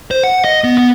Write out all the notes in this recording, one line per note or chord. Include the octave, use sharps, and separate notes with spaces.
C5
F#5
D#5
B3
B3